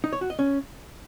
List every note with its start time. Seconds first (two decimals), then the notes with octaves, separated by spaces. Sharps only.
0.04 D#4
0.13 C#5
0.21 F#4
0.30 D#5
0.39 C#4